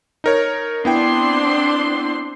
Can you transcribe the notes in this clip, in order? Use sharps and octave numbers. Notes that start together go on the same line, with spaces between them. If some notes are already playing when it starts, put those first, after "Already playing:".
D#4 A#4 C#5
B3 C4 D4 E4 G5 C6